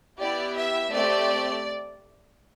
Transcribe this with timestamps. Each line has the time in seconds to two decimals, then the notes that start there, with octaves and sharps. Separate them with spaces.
0.18 B3 E4 G4 D5
0.54 E5
0.90 A3 C4 G4 D5